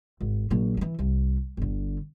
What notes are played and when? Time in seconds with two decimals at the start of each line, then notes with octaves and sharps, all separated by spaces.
0.21 G#1
0.50 A#1 F#3
0.77 E3 F3
0.99 C2
1.57 G1 D3